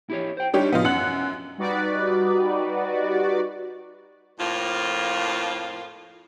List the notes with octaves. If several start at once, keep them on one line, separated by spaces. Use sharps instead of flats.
E4 G4 C#5
C5 G5
G3 D4 D#4 F4 G4 C#5
A2 C3 F3 B3 D#4 F4
F#2 F#5 F#6 F#7
G3 D#4 F#4 B4 D5
F2 A2 F3 A#3 F4